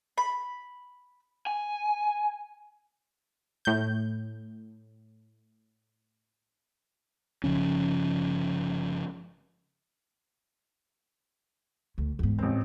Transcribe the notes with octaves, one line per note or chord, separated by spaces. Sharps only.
B5
G#5
A2 G6
G1 C#3 F3 C#4
D2
E2 G#2
A1 C4